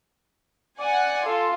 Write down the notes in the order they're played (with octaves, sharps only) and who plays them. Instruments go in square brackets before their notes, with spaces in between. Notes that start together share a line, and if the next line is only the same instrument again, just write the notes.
[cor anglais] D5 [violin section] F#5 G#5
[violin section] F4 [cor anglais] A4